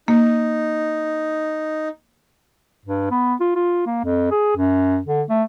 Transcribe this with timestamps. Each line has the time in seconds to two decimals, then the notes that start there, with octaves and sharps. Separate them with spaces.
0.08 A#3 D#4
2.85 G2
3.11 B3
3.40 F4
3.56 F4
3.86 A#3
4.04 F2
4.31 G#4
4.57 F#2
5.06 D3
5.30 A3